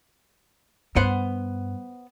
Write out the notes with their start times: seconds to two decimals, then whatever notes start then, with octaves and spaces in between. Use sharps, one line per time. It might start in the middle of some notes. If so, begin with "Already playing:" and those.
0.96 G2 B3 C5 F#5